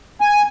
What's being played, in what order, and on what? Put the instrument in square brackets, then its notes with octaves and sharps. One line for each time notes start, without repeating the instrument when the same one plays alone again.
[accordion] G#5